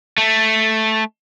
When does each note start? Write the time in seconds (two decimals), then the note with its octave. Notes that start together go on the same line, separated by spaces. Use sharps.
0.18 A3